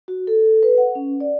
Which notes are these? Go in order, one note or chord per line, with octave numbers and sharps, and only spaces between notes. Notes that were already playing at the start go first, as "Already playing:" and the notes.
F#4
A4
B4
F#5
C#4
D5